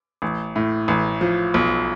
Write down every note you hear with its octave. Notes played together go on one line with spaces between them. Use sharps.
A1
A2
A1
F3
B1